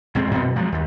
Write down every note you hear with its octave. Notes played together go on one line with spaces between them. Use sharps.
A#1 F2 G#3 C4
F#2 B2
F3 F#3 G#3
D#2